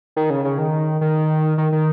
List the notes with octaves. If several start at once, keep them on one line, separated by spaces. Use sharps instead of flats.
D#3
C#3
C#3
D#3
D#3
D#3
D#3